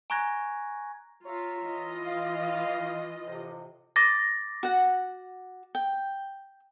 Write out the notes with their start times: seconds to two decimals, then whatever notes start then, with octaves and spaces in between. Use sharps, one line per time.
0.10 G#5 A#5 C#6 F#6 G#6 A#6
1.25 F4 C#5 E5 A#5
1.64 E3 F4 D#5
2.06 F5
3.25 F2 A2 C3
3.96 D6 A6 A#6
4.63 F#4 F#5
5.75 G5